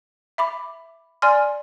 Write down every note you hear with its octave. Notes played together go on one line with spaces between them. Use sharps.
E5 B5 D6
D5 G#5 C6 F6